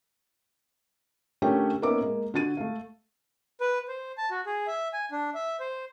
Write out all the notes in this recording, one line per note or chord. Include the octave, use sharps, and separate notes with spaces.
D3 A3 C#4 G4 A#4 C#5
A#3 B3 C#4 D#4 E5 D6
G#3 A#3
D3 F#4 A6 D#7
A3 F5
B4
C5
A5
F#4
G#4
E5
G#5
D4
E5
C5